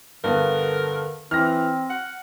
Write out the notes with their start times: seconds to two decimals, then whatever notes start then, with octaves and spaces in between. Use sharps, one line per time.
0.24 G2 D3 B3 A#4
1.31 E3 C4 F6 A#6
1.90 F#5